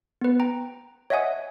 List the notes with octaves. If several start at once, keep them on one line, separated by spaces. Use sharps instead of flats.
B3 B4
G5 A#5
C#5 D#5 E5 F#5 G#5 D#6